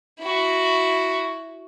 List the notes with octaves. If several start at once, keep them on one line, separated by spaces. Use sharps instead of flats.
E4 F#4